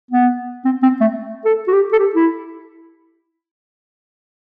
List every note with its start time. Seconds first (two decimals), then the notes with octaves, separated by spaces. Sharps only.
0.11 B3
0.65 C4
0.83 C4
1.00 A3
1.45 A4
1.67 F#4
1.73 G4
1.92 A4
1.99 G4
2.15 E4